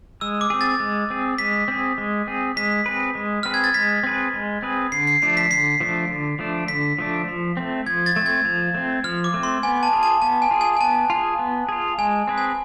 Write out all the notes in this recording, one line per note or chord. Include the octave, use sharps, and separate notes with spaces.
G#3 E6
D6
C4 G#4
A6
G#3
C4 G#4
G#3 B6
C4 G#4
G#3
C4 G#4
G#3 B6
C4 G#4 B4
G#3
C4 G#4 B4 F6
G#6
A6
G#3 B6
C4 G#4 B4
G#3
C4 G#4 B4
D3 C7
C7
F3 A3 D4 C7
B6
D3 C7
F3 A3 D4
D3
F3 A3 D4
D3 B6
F3 A3 D4
F3
A3 C4
F3 G#6
A6
A3 C4
G#6
F3
A3 C4
F3 F6
D6
A3 C4
C6
B3 G#5
A5
F4 G#4
A5
B3 A5
G#5
F4 G#4
G#5
G#5
B3 A5
F4
G#4
B3
F4 G#4
G#3 G#5
C4 G#4 B4
G#5